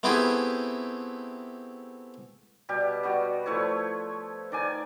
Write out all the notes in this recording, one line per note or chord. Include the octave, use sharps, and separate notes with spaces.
A3 B3 C4 E4 G4 G#4
B2 G3 G4
G3 B3 F#4
F3 A3 E4 C#5
D#3 D5 G#5